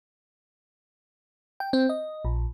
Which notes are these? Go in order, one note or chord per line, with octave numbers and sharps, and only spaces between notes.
G5
C4
D#5
A#1